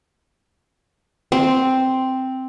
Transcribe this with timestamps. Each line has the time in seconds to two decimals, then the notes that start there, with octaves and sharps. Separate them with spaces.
1.32 C4